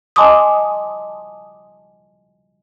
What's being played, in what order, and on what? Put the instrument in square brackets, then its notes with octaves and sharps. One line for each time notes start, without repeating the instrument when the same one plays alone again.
[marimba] D#5 G#5 A5 C6 D6 D#6